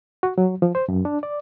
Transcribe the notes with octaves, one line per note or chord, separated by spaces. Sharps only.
F#4
F#3
F3
C5
F#2
D4
D5